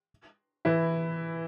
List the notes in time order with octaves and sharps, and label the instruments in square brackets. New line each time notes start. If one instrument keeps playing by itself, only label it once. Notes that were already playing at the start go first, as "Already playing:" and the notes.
[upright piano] E3 E4